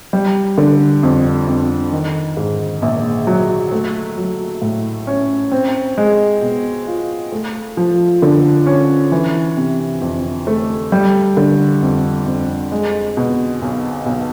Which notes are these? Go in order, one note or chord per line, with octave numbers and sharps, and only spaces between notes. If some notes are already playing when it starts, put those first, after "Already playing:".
G3
D3
F2
F2
D#3
G#2
A#1
F#3
A3
F#3
A2
C#4
C4
G#3
B2
F4
A3
F3
D3
C#4
E3
C3
F2
A3
G3
D3
F2
F2
G#3
B2
B1
B1